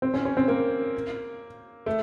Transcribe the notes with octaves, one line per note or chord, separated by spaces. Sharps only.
C4
C#4
C#4
C4
A#3
A3